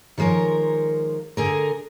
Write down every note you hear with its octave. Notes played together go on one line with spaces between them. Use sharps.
D#3 F3 G#3 A#4 C#5
D3 G#4 A#4